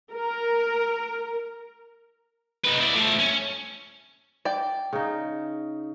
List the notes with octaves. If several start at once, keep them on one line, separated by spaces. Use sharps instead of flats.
A#4
D#4 B4
E4 D5
F3 A3
C#4
D5 G5
C#3 D#4